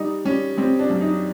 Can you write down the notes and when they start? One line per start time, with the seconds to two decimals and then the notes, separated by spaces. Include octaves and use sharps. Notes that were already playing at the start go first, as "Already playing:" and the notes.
Already playing: G3 D#4
0.25 G3 C#4
0.57 G3 C4
0.79 D4
0.90 F#2
1.01 D#4